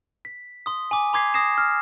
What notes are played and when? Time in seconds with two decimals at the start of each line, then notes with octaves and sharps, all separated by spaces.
0.25 B6
0.66 C6 D#6
0.91 G#5 D6
1.13 A#5 C6 D6 G#6 B6 C7
1.34 D#6 A#6 C7 E7
1.58 F6